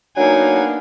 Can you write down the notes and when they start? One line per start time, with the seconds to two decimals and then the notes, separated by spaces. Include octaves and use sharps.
0.17 F#3 A#3 B3 D4 D#4 G#5